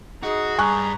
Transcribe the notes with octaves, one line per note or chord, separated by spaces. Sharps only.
D#4 F#4 G#4
G2 G#5 A#5 C#6 F#6